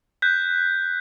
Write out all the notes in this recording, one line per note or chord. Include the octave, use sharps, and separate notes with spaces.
F#6 G6 B6